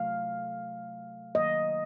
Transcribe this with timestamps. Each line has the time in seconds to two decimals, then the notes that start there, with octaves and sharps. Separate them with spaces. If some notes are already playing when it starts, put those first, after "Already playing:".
Already playing: C3 F#3 A3 F5
1.35 D#3 F#3 A#3 D#5